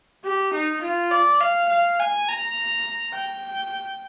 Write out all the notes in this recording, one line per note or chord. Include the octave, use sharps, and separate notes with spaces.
G4
D#4
F4
D5
F5
F5
G#5
A#5
G5